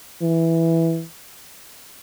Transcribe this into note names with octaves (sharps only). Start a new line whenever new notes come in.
E3